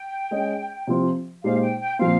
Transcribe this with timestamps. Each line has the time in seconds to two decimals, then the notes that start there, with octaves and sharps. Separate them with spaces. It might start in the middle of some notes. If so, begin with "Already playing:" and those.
Already playing: G5
0.31 G#3 C#4 G#4 D#5
0.87 C3 F3 C4 F4
1.43 A#2 G#3 D#4 G4 C5 F5
1.62 G5
1.81 G5
1.99 A#2 F3 C4 F5